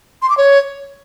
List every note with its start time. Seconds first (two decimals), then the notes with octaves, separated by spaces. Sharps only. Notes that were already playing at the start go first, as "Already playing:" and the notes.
0.22 C6
0.30 D6
0.37 C#5